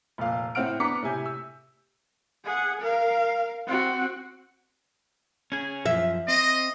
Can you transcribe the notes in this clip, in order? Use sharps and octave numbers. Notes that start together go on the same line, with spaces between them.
F1 A#2 F5
A2 C4 F#5 F6 D7
B3 D4 A#5 D6 B6 C#7
A2 C3 G#5 G6
E6
G#4 F#5
A#4 F5
C4 F#4
C#4 G#4
F#2 F3 E5
C4 D#5